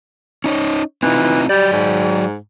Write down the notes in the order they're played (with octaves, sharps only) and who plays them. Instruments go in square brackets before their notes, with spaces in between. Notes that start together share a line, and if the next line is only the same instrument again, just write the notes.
[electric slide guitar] C#4 D#4 C#5
[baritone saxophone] E3 [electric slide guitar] C4 D#4 F4
[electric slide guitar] F#3 D5 [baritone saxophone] G3
[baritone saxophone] G#2